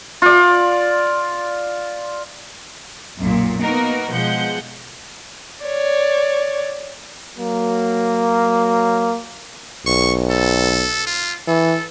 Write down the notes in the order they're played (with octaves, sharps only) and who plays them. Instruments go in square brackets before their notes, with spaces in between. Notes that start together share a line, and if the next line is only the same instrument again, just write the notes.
[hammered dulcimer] F4 D5
[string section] B1 F#2 A#2
A#3 B3 D#4 F#4 A#4
B2 F3 G#3 F#5 G6 C#7
[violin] C#5 D5
[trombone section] F#3 A#3
[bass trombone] B1 [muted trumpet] C#6
[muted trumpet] A4
F4
[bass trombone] E3 [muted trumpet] A4